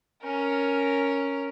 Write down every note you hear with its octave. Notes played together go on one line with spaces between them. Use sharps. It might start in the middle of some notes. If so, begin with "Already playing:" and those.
C#4 A#4